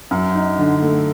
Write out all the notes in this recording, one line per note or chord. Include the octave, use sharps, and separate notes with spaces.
F#2
D#4
D3
A3